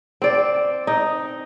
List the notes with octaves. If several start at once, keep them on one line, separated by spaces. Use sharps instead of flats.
C4 D5
D#4